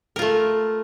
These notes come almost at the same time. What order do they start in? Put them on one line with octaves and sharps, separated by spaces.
A#4 F4 A3